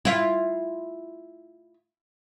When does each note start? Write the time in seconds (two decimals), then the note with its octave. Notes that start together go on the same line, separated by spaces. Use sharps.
0.05 E4 F4